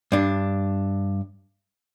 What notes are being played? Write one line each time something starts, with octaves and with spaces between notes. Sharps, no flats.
G2 D4